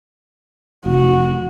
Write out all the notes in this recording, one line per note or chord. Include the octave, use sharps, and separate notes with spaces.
F1 F#4